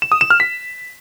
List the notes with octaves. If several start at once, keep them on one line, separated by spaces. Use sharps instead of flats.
E7
D#6
E7
F6
B6